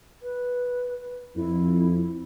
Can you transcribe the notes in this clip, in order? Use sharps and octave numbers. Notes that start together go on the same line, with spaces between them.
B4
F2 E4